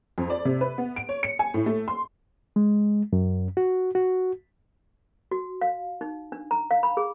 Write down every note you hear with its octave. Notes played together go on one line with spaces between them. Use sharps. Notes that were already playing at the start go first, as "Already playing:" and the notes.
F2
D5
C3
B4
B3
D7
C#5
C#7
G#5
A2
A3
C6
G#3
F#2
F#4
F#4
F#4
F5
D#4
D4
A#5
F5
B5
G#4